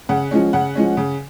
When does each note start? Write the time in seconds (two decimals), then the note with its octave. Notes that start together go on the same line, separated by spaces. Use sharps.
0.09 C#3 F#5
0.31 F3 G#3 C#4
0.53 C#3 F#5
0.75 F3 G#3 C#4
0.97 C#3